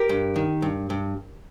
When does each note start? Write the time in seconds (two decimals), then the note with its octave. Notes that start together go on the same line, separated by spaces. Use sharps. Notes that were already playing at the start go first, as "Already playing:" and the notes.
Already playing: G4 A#4
0.09 G2
0.36 D#3
0.62 G2
0.90 G2